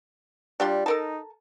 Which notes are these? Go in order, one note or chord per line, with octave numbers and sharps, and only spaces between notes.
G3 D4 F4 C6
D#4 A4 A#4 A5